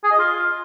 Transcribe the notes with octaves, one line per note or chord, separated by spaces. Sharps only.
G#4
D#5
F4